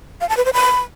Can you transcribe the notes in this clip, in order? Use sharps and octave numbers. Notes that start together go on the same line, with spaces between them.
F5
A5
B4
C5
B5